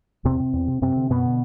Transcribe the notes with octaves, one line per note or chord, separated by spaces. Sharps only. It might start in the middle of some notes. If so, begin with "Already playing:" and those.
E2 C3 C4
C3
E2
C3
F#2 C3 C4
D3
F#2 B2 B3
D3